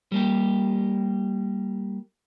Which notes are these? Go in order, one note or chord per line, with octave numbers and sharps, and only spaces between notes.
G3 A#3 G4